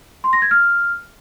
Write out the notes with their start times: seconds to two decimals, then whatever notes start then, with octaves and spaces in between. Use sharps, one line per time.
0.24 C6
0.33 A#6
0.42 G#6
0.51 F6